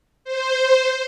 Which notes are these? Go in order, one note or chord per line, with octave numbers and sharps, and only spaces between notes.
C5